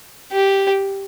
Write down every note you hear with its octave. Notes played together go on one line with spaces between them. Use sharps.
G4